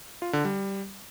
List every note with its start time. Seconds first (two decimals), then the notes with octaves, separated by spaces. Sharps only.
0.22 F4
0.33 D3
0.45 G3